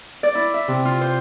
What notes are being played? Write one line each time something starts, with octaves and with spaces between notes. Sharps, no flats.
D5
E4
E5
C3
F4
C5